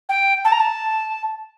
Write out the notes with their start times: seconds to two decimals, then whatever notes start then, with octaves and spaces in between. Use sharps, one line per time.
0.09 G5
0.44 A5
0.52 A#5
0.59 A5